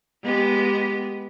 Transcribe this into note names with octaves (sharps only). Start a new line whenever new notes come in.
G#3 B3 G4